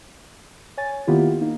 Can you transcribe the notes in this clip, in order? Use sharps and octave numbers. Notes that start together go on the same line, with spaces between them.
C#5 G#5 A6
D#3 A#3 B3 E4 F4 G4
A#3 D#4